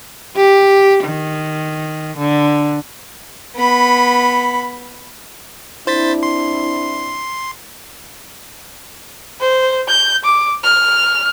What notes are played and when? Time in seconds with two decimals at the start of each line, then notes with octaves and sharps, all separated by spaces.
0.36 G4
1.04 D#3
2.17 D3
3.56 B3 B5
5.87 C4 D4 E4 C5 A6 B6
6.23 C6
9.41 C5
9.88 G6
10.24 D6
10.64 F6